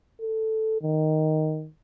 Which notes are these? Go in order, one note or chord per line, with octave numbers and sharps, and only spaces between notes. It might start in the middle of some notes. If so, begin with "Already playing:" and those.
A4
D#3